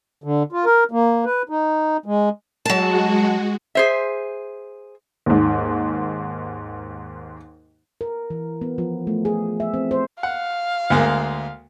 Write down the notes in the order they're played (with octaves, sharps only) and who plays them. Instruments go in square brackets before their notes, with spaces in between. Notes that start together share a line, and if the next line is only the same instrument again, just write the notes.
[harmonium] D3
F4
A#4
A#3
B4
D#4
G#3
[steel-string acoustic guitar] F#3 A5 [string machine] G#3 F#4
[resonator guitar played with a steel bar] G#4 C5 E5
[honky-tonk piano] D#2 G#2
[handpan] A#4
E3
B3
F3
A3
G#4
E5
C4
C5
[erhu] F5 [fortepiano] F#5
[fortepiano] D2 G#3 A#3